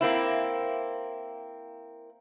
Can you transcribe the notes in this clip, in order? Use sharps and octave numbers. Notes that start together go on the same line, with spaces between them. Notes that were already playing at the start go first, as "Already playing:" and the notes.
A#3 C4 E4